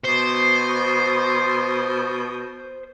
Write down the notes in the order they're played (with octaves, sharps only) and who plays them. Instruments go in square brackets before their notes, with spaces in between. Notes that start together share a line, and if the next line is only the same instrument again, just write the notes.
[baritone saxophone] B2 [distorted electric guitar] C5